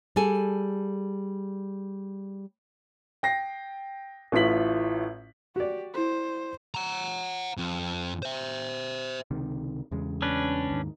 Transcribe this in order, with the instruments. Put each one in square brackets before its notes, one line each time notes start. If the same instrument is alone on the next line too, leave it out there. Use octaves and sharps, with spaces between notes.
[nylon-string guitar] G3 G#4 A4 G#5
[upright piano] G5 A#6 C7
A1 A2 F4 B6 F#7
[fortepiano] F#4 D5 [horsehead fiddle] G4
[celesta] E4 A4 [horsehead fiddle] C5
[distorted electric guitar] F#5 A#5
F2
C5 E5
[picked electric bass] C#2 C3 D#3
E2 C#3 G#3
[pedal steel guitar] C#4 D4 B4
[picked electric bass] D#2 G#2 D#3